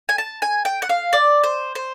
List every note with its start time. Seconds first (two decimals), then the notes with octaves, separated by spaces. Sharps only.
0.09 G#5
0.18 A5
0.42 G#5
0.65 G5
0.82 F#5
0.89 F5
1.13 D5
1.44 C5
1.75 C5